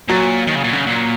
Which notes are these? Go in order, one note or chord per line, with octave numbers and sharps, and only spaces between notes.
A#2 F#3
D#3
C#3
A#2
C#3
A#2